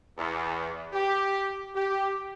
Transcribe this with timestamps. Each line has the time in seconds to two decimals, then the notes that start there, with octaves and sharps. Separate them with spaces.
0.18 E2
0.93 G4
1.75 G4